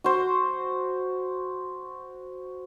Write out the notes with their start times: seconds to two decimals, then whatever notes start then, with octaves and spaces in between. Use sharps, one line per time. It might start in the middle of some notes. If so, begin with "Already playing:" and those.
0.04 F#4 C5